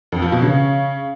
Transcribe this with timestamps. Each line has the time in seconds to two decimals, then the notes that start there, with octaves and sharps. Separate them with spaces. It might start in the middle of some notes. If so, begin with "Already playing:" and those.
0.12 F2
0.22 F3
0.32 B2
0.42 C#3